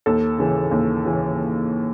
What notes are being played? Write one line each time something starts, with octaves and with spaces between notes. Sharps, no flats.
D#2 A4
C#3 E3
D#2
C#3 E3